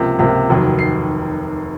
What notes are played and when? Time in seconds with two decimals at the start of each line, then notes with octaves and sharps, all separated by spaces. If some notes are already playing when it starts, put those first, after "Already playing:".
Already playing: C#2 C3 F3 A#3
0.19 C#2 C3 F3 A#3
0.49 F1 D#2 D#3 F#3
0.79 C7